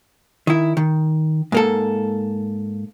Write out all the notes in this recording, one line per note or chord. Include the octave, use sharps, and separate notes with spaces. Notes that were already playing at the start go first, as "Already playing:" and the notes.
D#3 E4
D#3
G#2 A#3 A4